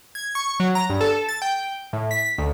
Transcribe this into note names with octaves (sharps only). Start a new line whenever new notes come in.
G#6
C#6
F#3
A#5
G2
A4
A6
G5
A2
B6
D2